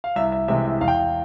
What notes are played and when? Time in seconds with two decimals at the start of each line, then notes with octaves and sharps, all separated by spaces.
0.04 F5
0.16 C2 E5
0.32 E5
0.48 C3 E3 G#3 E5
0.65 E5
0.81 E2 F5
0.88 G5
0.95 F5